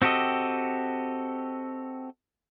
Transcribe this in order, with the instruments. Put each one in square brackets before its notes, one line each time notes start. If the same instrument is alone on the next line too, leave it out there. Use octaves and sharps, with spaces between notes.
[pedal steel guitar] C4 F#4 G4 A4 D#5